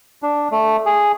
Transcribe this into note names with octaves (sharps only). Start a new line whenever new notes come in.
D4
A3
G#4